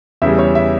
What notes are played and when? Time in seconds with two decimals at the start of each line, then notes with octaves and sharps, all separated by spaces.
0.22 E2 C#3 G3 E5
0.39 C#5
0.55 E5